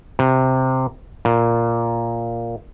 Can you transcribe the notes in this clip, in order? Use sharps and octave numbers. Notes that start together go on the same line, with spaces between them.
C3
A#2